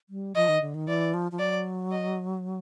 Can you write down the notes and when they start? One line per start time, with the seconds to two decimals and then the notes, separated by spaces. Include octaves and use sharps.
0.09 G3
0.35 F3 D#5
0.48 D#3
0.62 D3
0.75 D#3
0.88 E3 D5
1.14 F3
1.32 F3
1.39 F#3 D5
1.91 D#5